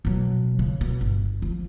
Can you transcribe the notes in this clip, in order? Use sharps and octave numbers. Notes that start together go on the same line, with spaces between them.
B2 F#3
C#3
B2
G1
F2 F3